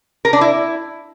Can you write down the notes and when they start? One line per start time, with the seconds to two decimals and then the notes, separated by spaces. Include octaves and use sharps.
0.25 A#4
0.33 D4
0.41 E4